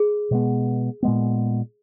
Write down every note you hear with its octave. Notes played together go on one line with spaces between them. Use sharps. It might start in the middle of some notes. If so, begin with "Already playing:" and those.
Already playing: G#4
B2 G#3 B3
A#2 G#3 B3